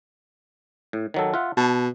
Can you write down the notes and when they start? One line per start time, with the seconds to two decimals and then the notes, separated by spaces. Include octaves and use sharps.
0.93 A2
1.14 D#3 F#3 A4
1.34 F4 E5 F#5
1.57 B2 A5